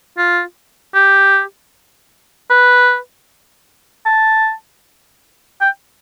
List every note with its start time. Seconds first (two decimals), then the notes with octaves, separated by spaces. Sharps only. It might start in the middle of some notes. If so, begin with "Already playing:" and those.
0.18 F4
0.95 G4
2.50 B4
4.06 A5
5.61 G5